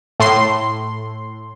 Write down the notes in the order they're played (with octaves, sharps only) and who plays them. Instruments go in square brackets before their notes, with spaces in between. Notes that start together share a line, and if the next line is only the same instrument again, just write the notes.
[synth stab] A2 C6